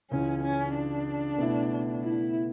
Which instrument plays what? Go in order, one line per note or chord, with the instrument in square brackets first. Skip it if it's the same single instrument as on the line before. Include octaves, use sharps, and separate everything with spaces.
[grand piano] C#2 C#3 E3 [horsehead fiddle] C#4
[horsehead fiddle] C#4
D4
[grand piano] B2 A3 E4
[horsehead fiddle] E4